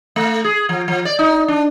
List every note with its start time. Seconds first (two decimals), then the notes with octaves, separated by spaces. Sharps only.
0.16 A3
0.44 G#4
0.69 F3
0.88 F3
1.05 D5
1.19 D#4
1.48 D4